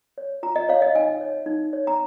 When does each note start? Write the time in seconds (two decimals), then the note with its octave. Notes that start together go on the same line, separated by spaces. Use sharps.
0.18 C#5
0.43 F4 A#5
0.56 D#5
0.69 C#5 F5
0.82 D#5
0.95 D#4 G#5
1.21 C#5
1.46 D#4
1.73 C#5
1.87 A#5